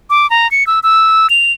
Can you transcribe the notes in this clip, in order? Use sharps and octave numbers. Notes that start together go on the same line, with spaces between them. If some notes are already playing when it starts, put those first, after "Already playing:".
D6
A#5
C#7
E6
E6
F7